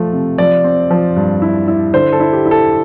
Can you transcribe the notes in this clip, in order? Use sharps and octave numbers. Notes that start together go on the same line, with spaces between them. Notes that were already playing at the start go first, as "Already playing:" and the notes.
Already playing: F3 A3
C3
F3 D5
C4
F3
G2
E4
E4
D3 C5
A4
E4
G4
E4
A4